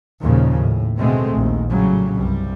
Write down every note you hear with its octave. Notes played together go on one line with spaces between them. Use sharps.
D#2 A#2 C#3 F3
A2
B2 D3 G#3 A3 C4
A#1 D#2
A2 C#3 F#3 G3
C2 G2 G3